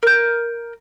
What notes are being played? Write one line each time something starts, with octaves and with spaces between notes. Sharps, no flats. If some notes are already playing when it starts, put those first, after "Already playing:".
A#4 G6